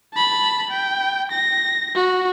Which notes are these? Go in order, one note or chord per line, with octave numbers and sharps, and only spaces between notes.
A5 B5
G5
A#6
F#4